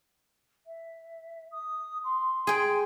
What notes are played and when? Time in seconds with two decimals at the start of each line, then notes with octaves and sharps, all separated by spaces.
0.67 E5
1.52 D#6
2.04 C6
2.47 G#4 G5